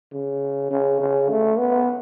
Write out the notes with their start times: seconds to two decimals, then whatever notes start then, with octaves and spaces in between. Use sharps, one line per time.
0.13 C#3
0.71 C#3
1.00 C#3
1.29 A3
1.58 B3